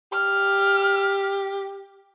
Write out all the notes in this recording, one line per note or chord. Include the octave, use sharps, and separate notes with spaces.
G4 F6